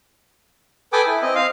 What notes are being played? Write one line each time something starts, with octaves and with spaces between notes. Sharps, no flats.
A4 B4 G5 G#5 D6 D#6
E4
C4 D#5
F5